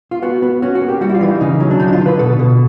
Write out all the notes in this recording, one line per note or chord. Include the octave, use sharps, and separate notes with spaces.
F4
B3 F#4
B3
C#4 F#4
F#4
A#3
G4
G3 F#4
E4
F4
E3 E4
D#4
C#3 D#4
F#3
D4
D3 D#4
E4
F4
D3
B4
B2 A4
B2